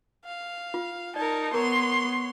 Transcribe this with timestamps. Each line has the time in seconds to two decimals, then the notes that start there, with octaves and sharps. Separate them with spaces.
0.25 F5
0.74 F4
1.16 D#4 A#4 D5 A5
1.54 B3 A#4 C#5 A#5 C6